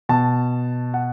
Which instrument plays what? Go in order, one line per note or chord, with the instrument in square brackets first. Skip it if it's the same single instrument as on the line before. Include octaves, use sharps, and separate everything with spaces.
[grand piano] B2 A5
F#5